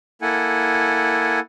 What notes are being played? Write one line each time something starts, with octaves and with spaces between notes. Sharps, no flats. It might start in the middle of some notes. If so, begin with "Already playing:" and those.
A#3 E4 A4 F#5 G#5